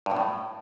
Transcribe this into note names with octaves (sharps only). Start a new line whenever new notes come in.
G2
B2
A2